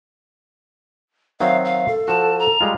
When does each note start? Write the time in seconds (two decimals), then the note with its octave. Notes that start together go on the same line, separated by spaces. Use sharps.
1.40 D#3 F#3 C4 E5 F5
1.65 F5
1.87 A4
2.08 F3 F#4 A5
2.39 A#5
2.61 G3 G#3 F4